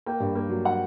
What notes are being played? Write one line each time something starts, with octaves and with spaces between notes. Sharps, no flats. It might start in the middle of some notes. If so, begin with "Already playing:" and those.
A#3 G5
G2
A#3
F#3
F#5